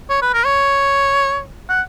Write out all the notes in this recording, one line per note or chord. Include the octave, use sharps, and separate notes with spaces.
C#5
B4
A#4
C#5
F#5